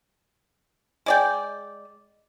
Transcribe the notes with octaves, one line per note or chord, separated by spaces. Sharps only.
G#3 D5 G5